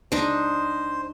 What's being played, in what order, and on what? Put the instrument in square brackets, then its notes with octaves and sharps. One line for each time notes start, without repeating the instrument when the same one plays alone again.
[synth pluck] C#2 [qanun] D4 D#4 [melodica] C5